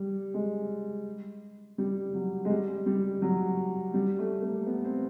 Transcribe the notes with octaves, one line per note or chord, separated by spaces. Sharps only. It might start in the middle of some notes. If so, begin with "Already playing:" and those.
Already playing: G3
G#3
G3
F#3
G#3
G3
G3
F#3
G3
A3
A#3
B3
C4